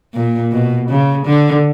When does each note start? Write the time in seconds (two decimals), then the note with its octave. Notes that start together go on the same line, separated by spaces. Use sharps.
0.14 A#2
0.52 B2
0.89 C#3
1.26 D3